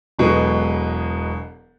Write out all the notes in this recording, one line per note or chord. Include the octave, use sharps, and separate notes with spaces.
E1 B2 F#3 G#3 A4 B4